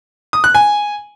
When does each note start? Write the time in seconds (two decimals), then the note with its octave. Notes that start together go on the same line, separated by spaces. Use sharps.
0.33 D#6
0.44 F#6
0.55 G#5